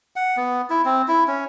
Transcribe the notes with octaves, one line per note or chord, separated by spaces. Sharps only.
F#5
B3
E4
C4
E4
C#4